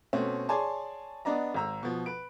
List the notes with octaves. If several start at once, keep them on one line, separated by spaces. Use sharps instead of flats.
B2 A3 C4 C#4
G#4 C#5 D5 G#5 A5 C6
B3 D4 D5 D#5 A#5
G#1 A#5 E6
B2 F3
B4 D7